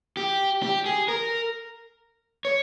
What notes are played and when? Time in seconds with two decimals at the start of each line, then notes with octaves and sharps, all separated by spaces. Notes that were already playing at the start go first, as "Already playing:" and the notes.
0.17 G4
0.63 G4
0.86 G#4
1.08 A#4
2.45 C#5